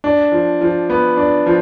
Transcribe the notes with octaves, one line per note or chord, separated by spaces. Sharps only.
D4
F3
F3
B3
D4
F3